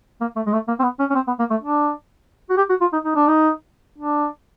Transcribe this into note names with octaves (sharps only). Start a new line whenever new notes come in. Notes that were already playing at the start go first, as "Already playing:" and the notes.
A#3
A3
G#3
A3
A#3
C4
B3
C#4
C#4
C4
B3
A#3
A3
D4
F#4
G4
F#4
F4
D#4
D#4
D4
D#4
D4